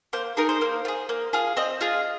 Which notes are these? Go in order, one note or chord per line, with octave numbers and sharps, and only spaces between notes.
A#3 C5
D#4 G#4 A#4
C5
A#3
F4
G#4
A#3
F4 G#4
C4 D#5
F4 G#4